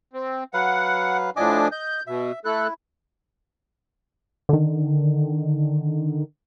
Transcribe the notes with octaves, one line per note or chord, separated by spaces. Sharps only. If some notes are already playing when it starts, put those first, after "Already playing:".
C4
F#3 B4 F5 F#5
A2 F3 D4 D#5 G#5 D6
D#5 G6
B2 E5
A3 E4 A4 F#6
D3 D#3